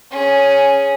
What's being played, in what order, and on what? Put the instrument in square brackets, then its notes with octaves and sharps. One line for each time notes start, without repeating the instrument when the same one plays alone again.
[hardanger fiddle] C#4 G#4